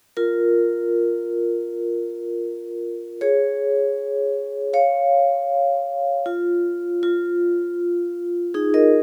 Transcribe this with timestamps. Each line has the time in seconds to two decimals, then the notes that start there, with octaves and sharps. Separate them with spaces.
0.17 F4 A#4
3.21 G#4 C#5
4.73 C#5 F5
6.26 F4
7.03 F4
8.54 D#4 G#4
8.74 A#4 D#5